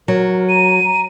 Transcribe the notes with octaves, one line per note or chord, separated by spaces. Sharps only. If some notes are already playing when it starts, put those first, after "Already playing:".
F#3 A#4
A#5 D#7
A#5